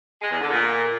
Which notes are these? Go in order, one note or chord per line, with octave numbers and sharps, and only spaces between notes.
G#3
E2
D3
A#2